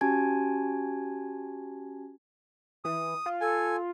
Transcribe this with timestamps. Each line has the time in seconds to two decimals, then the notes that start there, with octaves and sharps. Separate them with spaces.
0.01 C#4 F#4 G4 G#5 A5 G#6
2.85 E3 D#6
3.26 F4
3.41 A4 G#5